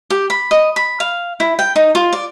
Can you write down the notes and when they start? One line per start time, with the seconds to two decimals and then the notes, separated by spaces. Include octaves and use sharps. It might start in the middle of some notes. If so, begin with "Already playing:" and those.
0.10 G4
0.30 B5
0.51 D#5
0.76 B5
1.00 F5
1.40 E4
1.59 G5
1.76 D#4
1.95 F4
2.12 D5